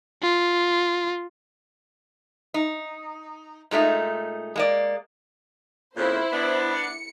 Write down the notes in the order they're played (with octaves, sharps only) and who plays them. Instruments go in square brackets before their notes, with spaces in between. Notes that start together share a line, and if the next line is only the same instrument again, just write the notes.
[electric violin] F4
[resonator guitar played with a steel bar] D#4
A#2 G#3 A3 D#4
G#3 A#3 D5
[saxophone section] F2 A#2 C#3 [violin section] E4 C5
[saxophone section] B3 D4
[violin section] C#7